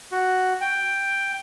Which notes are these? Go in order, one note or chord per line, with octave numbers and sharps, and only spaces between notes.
F#4
G5